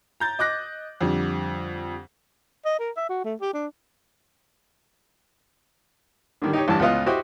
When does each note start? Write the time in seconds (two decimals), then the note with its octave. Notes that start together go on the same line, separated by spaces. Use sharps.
0.20 A#5 G6 A6
0.39 D#5 D6 F#6 A#6
1.01 F2 D3 G3
2.65 D#5
2.79 A#4
2.97 E5
3.09 F#4
3.24 A3
3.41 G4
3.54 D4
6.42 D3 D#3 G3
6.53 D#4 G4 C#5
6.68 A1 G2 E3 G3 A5
6.79 C#2 A2 B3 F4 D#5 F5
7.06 E4 F#4 G4 C5 D#5 D#6